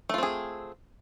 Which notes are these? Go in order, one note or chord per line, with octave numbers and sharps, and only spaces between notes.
A3 C4 F4 G#4